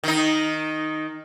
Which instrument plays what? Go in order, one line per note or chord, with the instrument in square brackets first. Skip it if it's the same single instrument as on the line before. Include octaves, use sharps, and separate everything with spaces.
[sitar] D#3 D#4